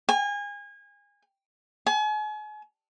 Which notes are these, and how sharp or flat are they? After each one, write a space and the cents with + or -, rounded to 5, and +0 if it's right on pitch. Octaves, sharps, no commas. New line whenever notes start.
G#5 -30
G#5 +40